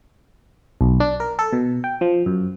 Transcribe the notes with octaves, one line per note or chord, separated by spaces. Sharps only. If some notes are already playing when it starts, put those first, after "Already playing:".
B1
D4
A#4
A4
B2
G5
F3
F#2